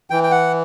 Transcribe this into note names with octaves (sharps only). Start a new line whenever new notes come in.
E3 G5
G5
F#5